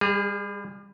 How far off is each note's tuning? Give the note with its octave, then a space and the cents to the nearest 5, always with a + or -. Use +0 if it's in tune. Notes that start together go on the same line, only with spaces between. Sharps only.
G3 +35 G#4 -10